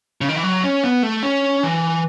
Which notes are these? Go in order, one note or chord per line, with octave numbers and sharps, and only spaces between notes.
C#3
D#3
E3
F#3
C#4
B3
A3
C#4
E3